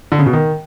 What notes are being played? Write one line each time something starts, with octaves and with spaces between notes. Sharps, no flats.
D3
C#3
B2
D#3